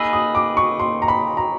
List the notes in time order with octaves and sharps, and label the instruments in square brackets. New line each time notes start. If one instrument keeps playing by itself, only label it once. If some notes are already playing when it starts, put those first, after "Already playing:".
Already playing: [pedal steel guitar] A#3 D#4 G#4 B4 [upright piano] E6
[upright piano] D#6
D6
C#6
C6
A#5
B5
A#5